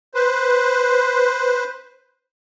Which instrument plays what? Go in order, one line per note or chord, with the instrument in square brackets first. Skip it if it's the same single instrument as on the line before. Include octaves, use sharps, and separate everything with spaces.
[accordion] B4 C5